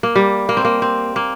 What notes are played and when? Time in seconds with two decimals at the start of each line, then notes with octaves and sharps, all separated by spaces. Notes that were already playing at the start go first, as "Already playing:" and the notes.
0.03 A#3
0.16 G3
0.49 A#3
0.57 C4
0.65 A#3
0.82 C4
1.16 A#3